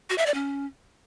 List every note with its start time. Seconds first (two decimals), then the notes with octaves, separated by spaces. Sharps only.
0.10 F#4
0.18 E5
0.26 D5
0.34 C#4